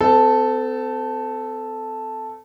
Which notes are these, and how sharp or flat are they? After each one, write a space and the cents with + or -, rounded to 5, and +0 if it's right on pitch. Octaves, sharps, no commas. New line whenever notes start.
C4 -40 A4 +0